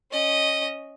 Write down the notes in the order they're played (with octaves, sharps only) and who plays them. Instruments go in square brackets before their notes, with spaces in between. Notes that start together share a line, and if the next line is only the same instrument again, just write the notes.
[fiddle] C#4 D#5